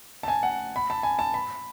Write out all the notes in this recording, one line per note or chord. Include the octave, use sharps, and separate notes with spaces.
A5
G#5
F#5
B5
A5
G#5
A5
B5